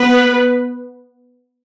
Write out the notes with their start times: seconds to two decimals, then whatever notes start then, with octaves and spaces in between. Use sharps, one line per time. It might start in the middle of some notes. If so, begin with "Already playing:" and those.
Already playing: B3 B4